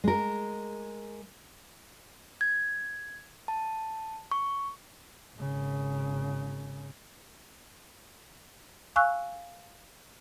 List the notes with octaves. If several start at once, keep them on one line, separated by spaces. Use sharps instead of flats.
G#3 A#4
G#6
A5
C#6
G#1 C#3
F5 G#5 C#6 E6 F#6